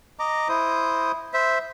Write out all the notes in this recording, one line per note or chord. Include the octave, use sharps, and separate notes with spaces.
D#5 A#5 D6
E4 C5 D#6
C5 E5